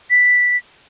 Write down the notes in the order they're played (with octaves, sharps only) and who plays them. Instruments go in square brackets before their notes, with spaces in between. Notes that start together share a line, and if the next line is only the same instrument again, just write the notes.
[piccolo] B6